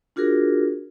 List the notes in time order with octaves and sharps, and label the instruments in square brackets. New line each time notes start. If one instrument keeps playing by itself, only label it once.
[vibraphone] D4 F4 F#4 G#4 A#4